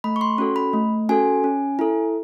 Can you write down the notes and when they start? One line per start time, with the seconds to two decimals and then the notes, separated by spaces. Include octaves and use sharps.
0.04 A3 B5
0.16 C#6
0.21 C6
0.38 C#4 F#4 A4
0.56 B5
0.73 A3
1.09 C#4 F#4 A4 G#5
1.44 C#4
1.79 E4 A4